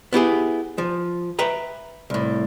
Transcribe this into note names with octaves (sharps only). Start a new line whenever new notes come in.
B3 E4 G4 G#4
F3
B4 E5 G5 A#5
C2 A2